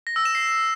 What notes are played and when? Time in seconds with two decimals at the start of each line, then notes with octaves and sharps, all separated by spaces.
0.07 A#6
0.16 E6
0.25 E7
0.35 C7